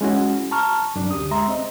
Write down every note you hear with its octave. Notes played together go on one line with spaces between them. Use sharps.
G#3 C#4 E4 F#4
A5 A#5 C#6 F6
F#2 D4
D2 G4 D#6
G#3 E5 A#5 C6
C4 D#5